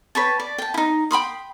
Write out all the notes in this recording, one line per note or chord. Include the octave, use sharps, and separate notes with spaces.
B4 C#5 G5 A5
D5
G5 A5
D#4 E4
G5 B5 C6 D#6